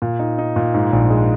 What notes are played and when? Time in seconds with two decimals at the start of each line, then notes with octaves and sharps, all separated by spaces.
0.02 A#2
0.19 D#4
0.38 D#4
0.56 A#2
0.74 G#2
0.93 A#1
1.10 G#3